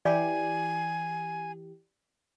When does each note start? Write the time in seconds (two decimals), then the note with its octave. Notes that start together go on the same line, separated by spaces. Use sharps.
0.05 E3 G4 D5 G#5